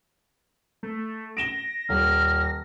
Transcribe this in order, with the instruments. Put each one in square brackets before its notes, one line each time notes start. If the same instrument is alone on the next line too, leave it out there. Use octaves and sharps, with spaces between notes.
[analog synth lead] A3
[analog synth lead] A#6 [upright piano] D7 E7 G7
[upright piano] D#1 [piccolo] F6